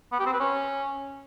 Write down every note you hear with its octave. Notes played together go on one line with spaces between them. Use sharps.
B3
G4
C4
B4
C#4